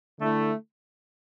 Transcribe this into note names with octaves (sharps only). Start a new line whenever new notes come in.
D3 A3 E4